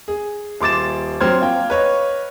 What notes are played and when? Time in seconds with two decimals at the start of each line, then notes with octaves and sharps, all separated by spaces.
0.08 G#4
0.61 D#1 C6 D6 A6 E7
1.21 F#3 C4 G5 C6 F6 G#6
1.41 A#3 F4 G5
1.70 B4 C#5 D#5